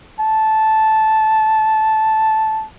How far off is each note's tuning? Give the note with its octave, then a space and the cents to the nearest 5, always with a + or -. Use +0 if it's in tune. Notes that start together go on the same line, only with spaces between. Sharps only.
A5 -10